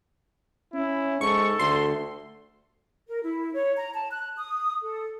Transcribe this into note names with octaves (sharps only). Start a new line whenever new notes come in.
C#4 E4
G#2 A4 C#6
D2 C6
A#4
E4
C#5
A#5
A5
F#6
D#6
A4